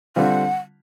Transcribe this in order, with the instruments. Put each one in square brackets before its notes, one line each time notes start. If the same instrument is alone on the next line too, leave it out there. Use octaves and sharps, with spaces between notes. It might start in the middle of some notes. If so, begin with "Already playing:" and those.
[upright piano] D3 G3 C4 F4 [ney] F#5